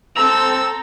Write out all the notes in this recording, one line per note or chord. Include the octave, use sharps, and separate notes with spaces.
C4 A4 A#5 E6